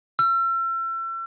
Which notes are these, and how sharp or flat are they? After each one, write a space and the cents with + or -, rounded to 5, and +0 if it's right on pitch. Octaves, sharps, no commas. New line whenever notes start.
E6 +40